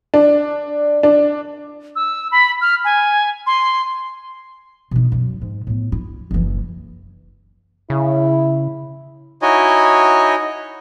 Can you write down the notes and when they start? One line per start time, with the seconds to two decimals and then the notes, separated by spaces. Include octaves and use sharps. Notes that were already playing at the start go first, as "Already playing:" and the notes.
0.14 D4
1.03 D4
1.96 E6
2.31 B5
2.61 F6
2.84 G#5
3.46 C6
4.91 B2 D#3
5.12 F#2
5.42 G#2
5.67 A2 B3
5.92 E4
6.31 F#1 E3
7.90 C#3 E4
9.42 D#4 E4 F#4 C#5 D#5 G#5